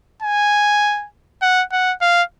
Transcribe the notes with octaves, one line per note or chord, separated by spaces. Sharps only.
G#5
F#5
F#5
F5